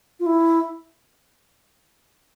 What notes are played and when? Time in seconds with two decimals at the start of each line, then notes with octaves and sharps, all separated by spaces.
0.20 F4
0.26 E4